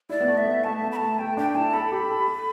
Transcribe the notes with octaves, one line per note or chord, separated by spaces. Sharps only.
E4 D5
B3
A3
E5
B3
A3 A5
B3
B5
A3 A5
A3 G5
D4 G5
E4 A5
A4 B5
G4
A4
A4